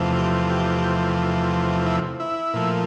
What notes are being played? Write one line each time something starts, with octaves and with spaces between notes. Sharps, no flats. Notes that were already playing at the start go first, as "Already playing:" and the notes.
Already playing: E2 C3 F3 A3
G4
G4
E4
E4
A#2 F3 A3